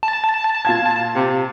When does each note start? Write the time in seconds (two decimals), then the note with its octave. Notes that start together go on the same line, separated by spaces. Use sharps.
0.03 A5
0.65 A#2 F5 G#6
1.15 C3